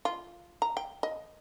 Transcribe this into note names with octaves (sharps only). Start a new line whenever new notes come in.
F4
A#5
G5
D#5